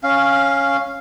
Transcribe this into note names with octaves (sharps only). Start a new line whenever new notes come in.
C#4 F5